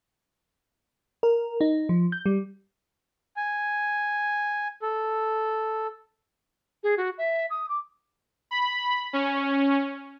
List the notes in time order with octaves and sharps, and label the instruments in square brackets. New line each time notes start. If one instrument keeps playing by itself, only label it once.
[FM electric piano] A#4
D#4
F3
G6
G3
[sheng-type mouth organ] G#5
A4
[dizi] G#4
F#4
E5
D#6
D6
[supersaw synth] B5
C#4